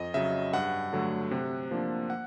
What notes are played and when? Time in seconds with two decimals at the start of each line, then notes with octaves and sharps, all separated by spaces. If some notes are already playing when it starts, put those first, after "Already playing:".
Already playing: F2 D#5
0.14 C#3 F#3 E5
0.53 G2 F#5
0.93 D3 F#3 A3
1.31 C3
1.71 F3 A#3 D4
2.10 F#5